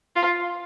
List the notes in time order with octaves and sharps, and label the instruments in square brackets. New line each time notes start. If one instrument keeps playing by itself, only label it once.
[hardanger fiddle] F4